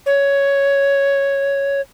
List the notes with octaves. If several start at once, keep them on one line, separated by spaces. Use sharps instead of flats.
C#5